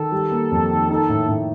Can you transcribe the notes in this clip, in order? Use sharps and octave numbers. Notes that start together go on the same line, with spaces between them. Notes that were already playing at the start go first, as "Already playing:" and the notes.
Already playing: D#3 A4
G3
A#3
F2
D#3
D#4 A4
A2
A2